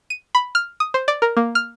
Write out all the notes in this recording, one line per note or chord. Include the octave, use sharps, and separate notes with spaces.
D#7
B5
F6
D#6
C5
D5
A#4
A#3
F6